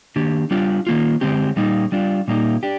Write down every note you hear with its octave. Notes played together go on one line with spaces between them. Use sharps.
D#3 A#3 D4 G4
G3 D4 F4
D#3 A#3 F4
D3 G#3 C4 G4
A#2 G3 A#3 D#4
G3 D4 F4
A#2 G3 A#3 D#4 G4
D4 G4